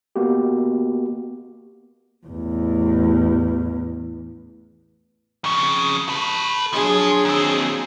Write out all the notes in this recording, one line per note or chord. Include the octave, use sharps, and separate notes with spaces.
A#3 B3 F#4 G4
A1 E2
F2 C#3
A4 B4
F3 F#3 D4 G#4
D#2 C4